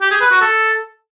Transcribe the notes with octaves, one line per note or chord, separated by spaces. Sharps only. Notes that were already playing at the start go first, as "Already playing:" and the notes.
G4
G#4
B4
F#4
A4